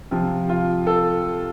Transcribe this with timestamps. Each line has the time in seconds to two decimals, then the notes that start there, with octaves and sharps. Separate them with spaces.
0.11 C3 F3 F4
0.49 F4
0.87 A4